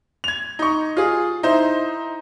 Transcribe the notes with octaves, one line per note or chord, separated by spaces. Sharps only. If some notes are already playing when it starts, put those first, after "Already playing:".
G#6 F7
D#4 C#6
F4 G#4
D#4 E4 C5